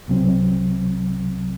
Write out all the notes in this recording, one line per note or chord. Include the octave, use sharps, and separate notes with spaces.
C2 C3 F#3 C4